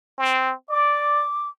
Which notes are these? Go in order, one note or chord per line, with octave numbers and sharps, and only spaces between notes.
C4
D5 D6